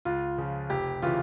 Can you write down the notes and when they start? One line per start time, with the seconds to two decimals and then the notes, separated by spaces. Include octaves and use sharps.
0.05 C#2 F4
0.38 C#3 F3
0.70 F1 G4
1.02 C#3 E3 F4